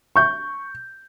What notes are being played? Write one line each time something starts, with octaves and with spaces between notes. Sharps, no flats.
C#6 G6